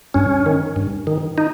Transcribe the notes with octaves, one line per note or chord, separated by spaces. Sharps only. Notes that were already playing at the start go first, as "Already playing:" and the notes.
G2 C#4
D#3
G2
D#3
D#4